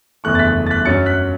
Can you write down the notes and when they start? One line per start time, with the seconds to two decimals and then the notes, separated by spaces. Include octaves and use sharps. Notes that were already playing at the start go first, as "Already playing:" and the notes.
0.24 F#1 E2 E3 A3 C#6 F#6
0.35 A6
0.39 F#6 B6
0.67 A6
0.71 F#6 B6
0.85 F#2 F#3 C#4 A6 C#7
1.06 F#6 B6